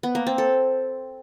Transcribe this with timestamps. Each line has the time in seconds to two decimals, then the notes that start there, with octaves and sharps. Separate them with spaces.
0.03 B3
0.15 A#3
0.27 C4
0.38 A4